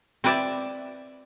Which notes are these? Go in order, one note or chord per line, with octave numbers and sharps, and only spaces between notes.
C4 E4 B4 D5 E5